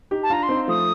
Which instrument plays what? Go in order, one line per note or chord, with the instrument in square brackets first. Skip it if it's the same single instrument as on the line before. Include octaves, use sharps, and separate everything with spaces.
[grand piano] D#4 G4
[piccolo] A5
[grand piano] D4 F4 [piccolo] A#5
[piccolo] C6
[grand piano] C4 D#4
[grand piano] F3 A3 [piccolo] D#6